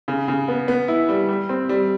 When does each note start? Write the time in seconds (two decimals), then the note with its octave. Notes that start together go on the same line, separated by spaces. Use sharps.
0.08 C#3
0.28 C#3
0.48 B3
0.68 B3
0.88 E4
1.09 G3
1.29 G3
1.49 C4
1.69 G3